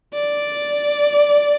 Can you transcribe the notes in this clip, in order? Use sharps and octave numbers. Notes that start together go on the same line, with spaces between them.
D5